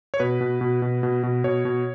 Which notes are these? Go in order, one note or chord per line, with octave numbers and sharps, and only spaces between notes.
C#5
B2 B4
B2
B2
B2
B2
B2
B2 C#5
B2